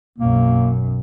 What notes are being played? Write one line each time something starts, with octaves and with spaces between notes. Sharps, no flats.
B1 F#2 A#3